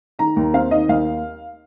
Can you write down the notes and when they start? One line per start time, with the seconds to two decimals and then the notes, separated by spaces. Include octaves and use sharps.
0.19 D#3 A#5
0.36 D#2
0.54 C4 F5
0.71 D#3 D#5
0.89 D#2 F5